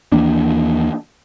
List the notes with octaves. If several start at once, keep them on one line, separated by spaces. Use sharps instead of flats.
D#2 E3 A#3 D4